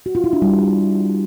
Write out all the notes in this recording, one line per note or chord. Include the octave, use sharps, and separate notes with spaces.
F#4
F4
E4
D4
G3